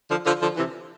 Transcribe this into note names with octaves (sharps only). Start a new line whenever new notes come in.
D3 F3
D3 F3
D3 F3
C3 E3